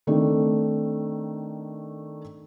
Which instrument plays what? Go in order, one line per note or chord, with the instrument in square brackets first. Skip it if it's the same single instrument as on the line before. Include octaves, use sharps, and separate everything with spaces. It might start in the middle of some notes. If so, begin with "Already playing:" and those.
[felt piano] D#3 A3 C4 D4